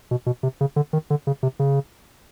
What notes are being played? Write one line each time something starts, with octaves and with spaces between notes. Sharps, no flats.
B2
B2
C3
C#3
D3
D#3
D3
C#3
C3
C#3